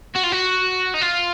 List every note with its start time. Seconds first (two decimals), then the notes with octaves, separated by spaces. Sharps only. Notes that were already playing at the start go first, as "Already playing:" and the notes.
0.15 F#4
0.23 F4
0.32 F#4
0.94 D#4
1.01 F4